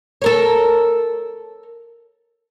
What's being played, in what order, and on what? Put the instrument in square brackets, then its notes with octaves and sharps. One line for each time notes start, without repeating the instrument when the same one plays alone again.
[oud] A4 A#4 C#5